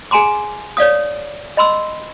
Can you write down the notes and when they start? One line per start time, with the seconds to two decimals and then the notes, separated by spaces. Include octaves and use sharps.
0.11 G#4 G#5 A#5 C6 D6
0.77 C#5 D5 F5 D#6
1.57 D#5 B5 C6 E6